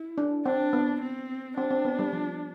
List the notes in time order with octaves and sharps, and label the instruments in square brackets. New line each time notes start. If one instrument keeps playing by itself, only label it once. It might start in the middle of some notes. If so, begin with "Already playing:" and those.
Already playing: [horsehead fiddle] E4
[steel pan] D4
[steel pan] C4 [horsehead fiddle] D4
[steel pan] B3
[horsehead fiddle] C4
[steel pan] C4 [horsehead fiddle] D4
[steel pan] C4
B3
G3
F3